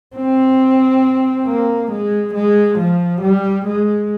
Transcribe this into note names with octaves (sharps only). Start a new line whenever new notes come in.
C4
A#3
G#3
G#3
F3
G3
G#3